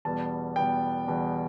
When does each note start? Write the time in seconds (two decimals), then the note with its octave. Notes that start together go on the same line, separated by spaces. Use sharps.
0.05 E2 B2 G3 B3 A5
0.56 E2 B2 G3 B3 G5
1.06 E2 B2 G3 B3